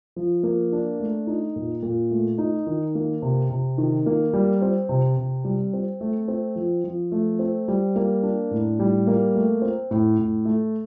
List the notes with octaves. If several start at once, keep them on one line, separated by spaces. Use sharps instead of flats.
F3
A#3
D4
A3
D#4
A#2
A#2
A3
D#4
D#3
A#3
C3
C3
D#3
A#3
G3
C4
C3
C3
G3
C4
A3
C4
F3
F3
A3
C4
G3
A#3
D4
A2
G3
A#3
A3
C4
A2
A2
A3